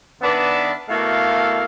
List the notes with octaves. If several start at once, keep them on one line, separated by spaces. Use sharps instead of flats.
D#3 B3 D4 B4 D5 E5
B2 A3 A#3 E4 A4 F5